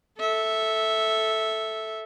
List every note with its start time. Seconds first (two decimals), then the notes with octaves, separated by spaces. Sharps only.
0.19 A4 E5